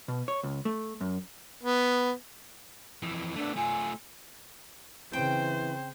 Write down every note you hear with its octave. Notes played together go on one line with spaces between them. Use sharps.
B2
C#5
C#2
A3
F#2
B3
F2 E3
A3 B3 D4
A3 F4 G#5
C#3 E3 C4 C5 G5